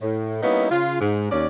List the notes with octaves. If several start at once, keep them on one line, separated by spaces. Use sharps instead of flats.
A2
G3 A#3 B3 C#4 D#4 E4
C#3 F4
G#2
D#2 C#4 D5